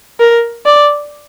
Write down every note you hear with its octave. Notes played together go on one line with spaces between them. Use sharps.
A#4
D5